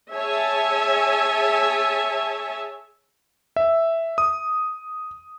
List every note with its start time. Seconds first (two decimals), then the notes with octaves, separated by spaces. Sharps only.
0.11 G#4 C#5 E5 G#5 A5
3.56 E5
4.18 D#6